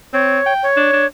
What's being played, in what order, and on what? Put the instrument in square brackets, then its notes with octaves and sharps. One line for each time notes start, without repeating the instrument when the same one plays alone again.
[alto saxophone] C4 [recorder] C#5
[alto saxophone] G5
[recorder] C#5
[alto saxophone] D4
D4